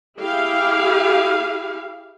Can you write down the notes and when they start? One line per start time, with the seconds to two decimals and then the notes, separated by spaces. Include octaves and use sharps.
0.19 E4 G4 G#4 F5